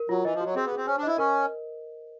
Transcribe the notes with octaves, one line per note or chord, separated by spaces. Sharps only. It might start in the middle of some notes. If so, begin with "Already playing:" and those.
Already playing: A#4
F#3 F4
E3 D#5
F3
F#3 F#4
C4 G#4
B3
G#4
C4
C#4 C5
D4
E4 D#5
C#4 A#4